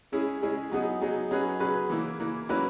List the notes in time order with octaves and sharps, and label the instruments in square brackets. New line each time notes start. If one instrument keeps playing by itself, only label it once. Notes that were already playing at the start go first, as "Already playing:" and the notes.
[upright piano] G#3 C#4 E4 G#4
G#3 C#4 E4 G#4
F#3 B3 D#4 G#4
F#3 B3 D#4 G#4
F#3 C#4 G#4 B4
F#3 C#4 G#4 B4
E3 A#3 E4
E3 A#3 E4
F#3 A#3 C#4 E4 B4